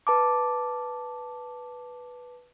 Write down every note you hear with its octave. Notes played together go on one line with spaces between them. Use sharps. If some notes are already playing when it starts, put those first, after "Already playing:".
B4 A5 D6